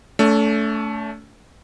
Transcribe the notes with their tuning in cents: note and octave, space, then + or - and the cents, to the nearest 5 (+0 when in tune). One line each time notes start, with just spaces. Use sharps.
A3 +0 C#4 +45